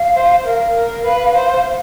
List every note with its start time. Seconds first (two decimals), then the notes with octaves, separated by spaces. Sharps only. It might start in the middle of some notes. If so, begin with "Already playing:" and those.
Already playing: F5
0.15 C5
0.45 A#4 F5
0.76 A#4
1.04 B4
1.35 C5